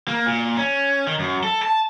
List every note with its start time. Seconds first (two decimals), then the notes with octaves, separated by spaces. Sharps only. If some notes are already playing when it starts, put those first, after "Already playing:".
0.08 A#3
0.26 A#2
0.57 C#4
1.07 D#3
1.19 F#2
1.43 A4
1.63 A5